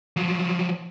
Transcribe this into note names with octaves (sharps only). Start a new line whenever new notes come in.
F3 F#3